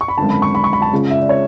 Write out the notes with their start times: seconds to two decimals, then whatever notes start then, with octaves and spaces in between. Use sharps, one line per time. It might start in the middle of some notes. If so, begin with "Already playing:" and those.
0.01 C#6
0.08 B5
0.17 G#1 F#2 D3 A5
0.30 B5
0.42 C#6
0.55 B5
0.64 C#6
0.73 B5
0.82 A5
0.92 C#2 C#3 G#3
1.10 E5
1.20 D5
1.29 C#5